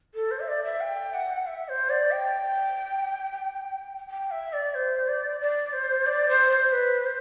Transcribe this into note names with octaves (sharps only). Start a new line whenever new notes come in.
A4
C5
E5
D5
E5
G5
F#5
E5
C5
D5
G5
G5
E5
D5
C5
D5
D5
C5
D5
C5
C5
B4
C5